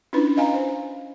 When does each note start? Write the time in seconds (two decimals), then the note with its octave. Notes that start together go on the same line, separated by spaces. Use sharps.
0.13 C#4 D4 E4 F4 B4
0.37 D#5 F5 G#5 A#5
0.54 C5